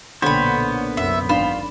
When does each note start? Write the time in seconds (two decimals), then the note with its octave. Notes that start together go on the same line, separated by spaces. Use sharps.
0.22 B1 A#2 D3 A#3 B3 C5 C#5 B5
0.97 C2 F#2 E5
1.29 G#1 D4 F4 B5 E7